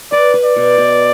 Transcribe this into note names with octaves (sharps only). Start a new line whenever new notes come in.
B4 D5
B4
D5
B2
B2